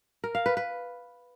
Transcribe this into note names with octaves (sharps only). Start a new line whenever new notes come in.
A#4
F5
B4
B4